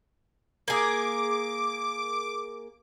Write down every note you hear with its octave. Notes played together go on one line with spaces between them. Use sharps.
A#3 G#4 D6